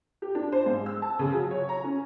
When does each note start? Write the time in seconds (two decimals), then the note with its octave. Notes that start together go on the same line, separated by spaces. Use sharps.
0.22 G4
0.35 D4
0.52 C5
0.66 G#2
0.86 E6
1.02 A5
1.19 C#3
1.34 F#3
1.51 C#5
1.69 A#5
1.84 C#4